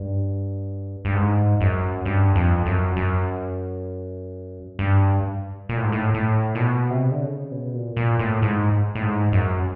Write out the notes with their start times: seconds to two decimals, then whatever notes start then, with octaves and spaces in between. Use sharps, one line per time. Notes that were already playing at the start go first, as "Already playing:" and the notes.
Already playing: G2
1.05 G2
1.15 G#2
1.61 F#2
2.05 G2
2.36 F2
2.66 F#2
2.96 F#2
4.79 G2
5.69 A#2
5.77 A2
5.84 G#2
5.92 A2
6.14 A2
6.55 A#2
6.60 B2
6.90 C3
7.12 D3
7.21 C#3
7.51 B2
7.74 A#2
7.97 A#2
8.19 A2
8.42 G#2
8.95 A2
9.02 G#2
9.33 F#2